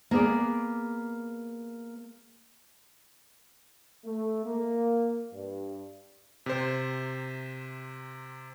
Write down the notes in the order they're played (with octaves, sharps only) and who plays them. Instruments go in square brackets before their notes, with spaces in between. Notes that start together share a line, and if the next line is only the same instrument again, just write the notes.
[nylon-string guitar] A#3 B3 G#4 D5
[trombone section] A3
A#3
G2
[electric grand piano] C3 C5